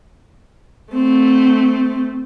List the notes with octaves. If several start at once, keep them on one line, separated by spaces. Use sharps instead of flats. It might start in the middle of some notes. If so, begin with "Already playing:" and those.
A3 C4